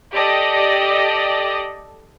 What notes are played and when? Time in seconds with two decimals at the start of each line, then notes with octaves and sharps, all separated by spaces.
0.13 G4 A4 D5 D#5